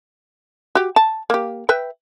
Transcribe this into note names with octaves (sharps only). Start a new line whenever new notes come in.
F#4 G4
A5
A#3 G4
B4 E5 G5